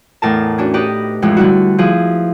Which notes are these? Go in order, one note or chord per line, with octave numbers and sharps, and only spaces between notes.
E2 A2 A#4 A5
C#4 D4 F#4
D#4 G4 B4 D5 D#5
F2 A2 E3 G#3
D3 G3 E4 F#4
F3 E4 G#4 B4